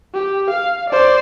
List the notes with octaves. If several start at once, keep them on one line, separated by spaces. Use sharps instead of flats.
G4
F5
C5 D5